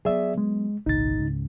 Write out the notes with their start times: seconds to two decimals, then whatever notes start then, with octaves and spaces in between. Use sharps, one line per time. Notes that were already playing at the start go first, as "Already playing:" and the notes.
0.05 F#3 B3 G#4 D5 E5
0.38 G#3
0.86 G#1 C#2 A#2 D#4 A6
1.18 C#2 G#2 C#3